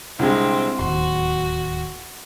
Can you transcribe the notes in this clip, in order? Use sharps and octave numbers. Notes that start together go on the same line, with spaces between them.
C2 D3 G#3 C4
D1 D#2 F#4 C6